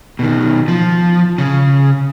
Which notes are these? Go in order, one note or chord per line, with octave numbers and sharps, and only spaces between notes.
B2 D#3
F3
C#3